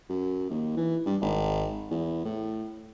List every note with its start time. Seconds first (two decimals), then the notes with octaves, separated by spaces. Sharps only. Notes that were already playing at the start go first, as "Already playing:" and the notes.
0.09 F#2
0.50 D#2
0.77 E3
1.06 G2
1.21 G#1
1.91 E2
2.25 A2